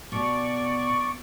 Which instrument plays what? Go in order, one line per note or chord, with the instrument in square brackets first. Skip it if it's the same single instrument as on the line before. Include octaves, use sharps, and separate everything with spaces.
[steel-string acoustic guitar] B2 [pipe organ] D5 C#6